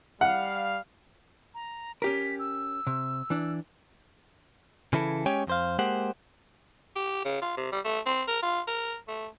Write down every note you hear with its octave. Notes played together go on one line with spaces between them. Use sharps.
G3 F5 F#5
A#5
C#4 G4 A#4 B6
E6
C3
E3 D4
C#3 E3 E4 A4
G#3 C#4 G4 C#5 G5 G#5
F2 C5 F5
G#3 A#3 G4 C5 F#5
G4
C#3
F4
C3
G3
A3
C4
A#4
F4
A#4
A3